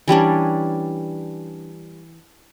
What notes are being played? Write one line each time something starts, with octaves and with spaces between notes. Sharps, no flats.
E3 G3 C#4 D4